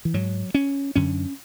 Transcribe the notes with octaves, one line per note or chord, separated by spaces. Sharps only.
E3
G#2 F#3
C#4
F#2 D3 C#4